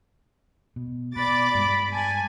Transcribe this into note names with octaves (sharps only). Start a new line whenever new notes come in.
B2
B2 D5 B5 D6 A6
G2 G#3
G#5 A5